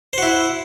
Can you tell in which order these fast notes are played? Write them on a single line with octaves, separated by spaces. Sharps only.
C5 F#4 E4